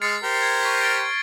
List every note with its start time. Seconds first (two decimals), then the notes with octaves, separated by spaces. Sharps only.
0.02 G#3 F6 A6 C7 C#7
0.23 G4 A#4 C5
0.42 G#6
0.62 C#6 B6
0.81 F6 A6 D7